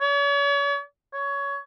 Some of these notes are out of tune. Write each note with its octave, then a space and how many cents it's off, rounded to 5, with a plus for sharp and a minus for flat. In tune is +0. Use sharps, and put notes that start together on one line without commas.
C#5 +40
C#5 +20